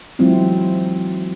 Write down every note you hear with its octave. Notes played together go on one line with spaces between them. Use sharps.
E3 F#3 G#3 C4 E4 F4